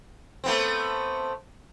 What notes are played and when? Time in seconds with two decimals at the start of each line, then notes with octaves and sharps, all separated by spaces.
0.44 A3 B3 C4